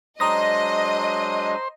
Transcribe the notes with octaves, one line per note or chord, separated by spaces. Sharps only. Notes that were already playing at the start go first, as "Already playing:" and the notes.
F#3 G#3 D4 C5 D#5 A#5 D#6 A#6